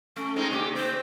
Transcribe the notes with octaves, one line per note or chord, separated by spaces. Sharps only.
A3 C#4
G#3 C4 D#4
C#3 A#3 G4
C4 C5